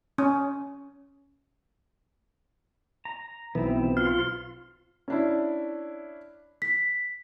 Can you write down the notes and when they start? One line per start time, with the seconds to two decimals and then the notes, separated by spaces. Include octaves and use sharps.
0.18 C#4
3.05 A#5
3.55 B1 E3 B3 C4
3.97 F4 F6
5.08 C#4 D4 E4
6.62 B6